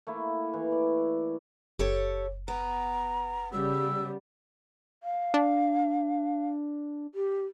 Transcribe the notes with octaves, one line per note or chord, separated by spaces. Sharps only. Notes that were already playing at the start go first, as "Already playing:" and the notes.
A3 A#3 E4
E3
D5
F#1 G4 A4 C#5
B3 A#5
C#3 G3 E6
F5
D4
G4